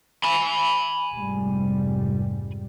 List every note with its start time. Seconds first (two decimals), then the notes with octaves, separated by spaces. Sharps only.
0.24 G#5 B5
1.15 F1 G#2 G3